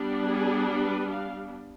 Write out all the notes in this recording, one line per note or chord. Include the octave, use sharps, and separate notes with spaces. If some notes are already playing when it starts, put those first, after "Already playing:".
Already playing: G3 B3 D4
G#4
B4
F5